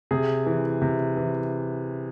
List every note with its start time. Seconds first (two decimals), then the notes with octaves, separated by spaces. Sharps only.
0.11 C3 G#4
0.46 E3
0.82 C3
1.17 E3